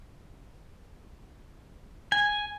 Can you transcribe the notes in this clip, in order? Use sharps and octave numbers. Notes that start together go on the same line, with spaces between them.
G#5